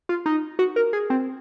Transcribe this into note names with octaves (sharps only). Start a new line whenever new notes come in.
F4
D#4
F#4
A#4
G#4
C4